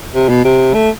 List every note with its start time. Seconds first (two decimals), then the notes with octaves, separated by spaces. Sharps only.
0.14 C3
0.29 B2
0.44 C3
0.74 A3